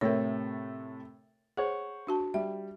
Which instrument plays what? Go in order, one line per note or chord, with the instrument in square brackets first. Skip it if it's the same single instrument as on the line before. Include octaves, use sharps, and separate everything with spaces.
[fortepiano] A2 C3 A3 [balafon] A#4 C#5
[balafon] G#4 [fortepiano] C5 C#5 F#5
[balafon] D4 F#4 A5
[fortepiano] G3 [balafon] E5